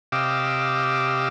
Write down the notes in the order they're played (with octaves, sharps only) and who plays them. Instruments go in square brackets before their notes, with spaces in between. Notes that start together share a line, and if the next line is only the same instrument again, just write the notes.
[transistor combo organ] C3 G4 D#5 F5 D6 E6